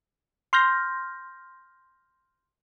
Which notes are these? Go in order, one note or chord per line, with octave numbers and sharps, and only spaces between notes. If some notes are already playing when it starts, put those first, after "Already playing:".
C6 F6 G6 A#6